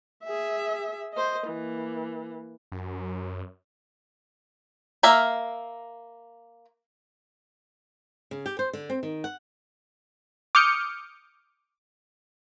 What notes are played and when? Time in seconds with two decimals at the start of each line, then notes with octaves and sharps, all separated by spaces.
0.24 G#4 E5
1.13 C5 D#5
1.47 E3 A#3
2.72 F#2
5.03 A#3 A#4 E5 F5
8.31 C#3
8.46 G4
8.59 C5
8.73 D3
8.90 C4
9.03 D#3
9.24 F#5
10.55 D6 D#6 F6 G6 C#7